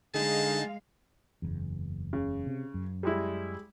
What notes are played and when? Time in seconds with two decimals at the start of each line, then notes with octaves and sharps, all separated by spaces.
0.14 D3 G#3 D#4 G#4 F5 A5
1.42 F#1 E2
2.13 C#3
2.46 C3
2.74 F#2
3.03 G3 G#3 E4